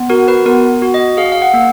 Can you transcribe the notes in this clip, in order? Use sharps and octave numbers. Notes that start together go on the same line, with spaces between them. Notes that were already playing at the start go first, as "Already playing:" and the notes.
Already playing: B3
F#4 A#4
B4
B3 A#4
F#4
D#5
G#4 F5
F5
F#5
A#3